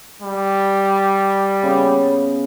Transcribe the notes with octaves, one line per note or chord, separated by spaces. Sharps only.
G3
C#3 B3